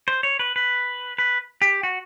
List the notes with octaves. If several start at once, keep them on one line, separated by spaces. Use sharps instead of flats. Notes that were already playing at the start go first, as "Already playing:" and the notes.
C5
C#5
B4
B4
B4
G4
F#4